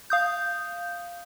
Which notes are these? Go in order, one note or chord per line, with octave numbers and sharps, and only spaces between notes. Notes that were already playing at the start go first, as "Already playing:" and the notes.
F5 D#6 G6